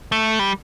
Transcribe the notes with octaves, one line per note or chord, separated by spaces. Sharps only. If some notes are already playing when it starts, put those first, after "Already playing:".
A3
G3